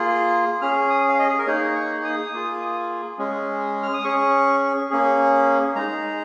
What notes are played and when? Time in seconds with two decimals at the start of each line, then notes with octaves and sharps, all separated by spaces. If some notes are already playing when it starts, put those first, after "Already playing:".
Already playing: A#3 F4 G#4
0.62 C#4 G#4 F6
0.90 D#6
1.09 F5
1.19 D#5
1.29 G#4
1.39 A#4
1.47 A#3 D#4 G#4 C#5
1.76 C#6
2.04 D#6
2.33 A#3 F4 G#4
3.19 G#3 C#4 G#4
3.83 F6
3.94 D#6
4.04 C#4 G#4 C#6
4.90 A#3 C#4 G#4
5.75 G#3 D#4 G#4 A#5